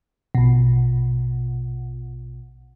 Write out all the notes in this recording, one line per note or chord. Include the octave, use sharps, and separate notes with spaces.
A#1 B2